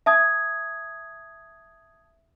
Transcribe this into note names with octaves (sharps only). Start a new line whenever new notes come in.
E5 A5 D#6 G#6